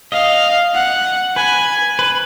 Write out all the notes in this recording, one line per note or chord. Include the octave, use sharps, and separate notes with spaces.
D#5 F5
F#5
B4 G#5
B4